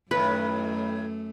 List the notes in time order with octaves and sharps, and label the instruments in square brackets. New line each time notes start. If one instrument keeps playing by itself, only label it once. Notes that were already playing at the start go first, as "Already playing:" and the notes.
[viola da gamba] F#2 A3 [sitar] A2 D#3 [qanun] B4 [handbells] B5